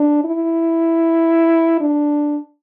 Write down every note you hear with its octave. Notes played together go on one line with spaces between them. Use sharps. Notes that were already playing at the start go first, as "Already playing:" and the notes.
Already playing: D4
E4
D4